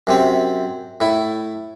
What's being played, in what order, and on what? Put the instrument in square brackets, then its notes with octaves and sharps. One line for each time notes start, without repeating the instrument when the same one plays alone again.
[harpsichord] F#2 C3 C4
A2 E4